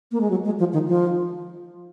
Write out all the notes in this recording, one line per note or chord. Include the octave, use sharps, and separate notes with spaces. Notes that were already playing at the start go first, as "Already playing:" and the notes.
A#3
G#3
F#3
G#3
F3
D#3
F3